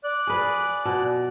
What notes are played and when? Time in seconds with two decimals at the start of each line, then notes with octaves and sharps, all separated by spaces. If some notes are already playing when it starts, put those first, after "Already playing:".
0.04 D5 F#6
0.27 G#4 B4
0.85 B2